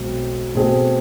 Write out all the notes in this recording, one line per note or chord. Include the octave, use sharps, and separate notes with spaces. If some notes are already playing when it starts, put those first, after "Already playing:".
Already playing: B1 B2 G#3 C4
B2 A3 C4 G#4